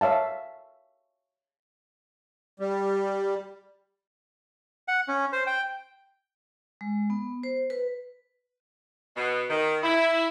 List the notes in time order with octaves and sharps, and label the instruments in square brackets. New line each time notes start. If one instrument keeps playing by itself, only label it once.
[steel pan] C#5 E5 F5 A5
[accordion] G3
[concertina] F#5
C#4
C5
G5
[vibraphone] G#3
B3
C5
B4
[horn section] B2
D#3
E4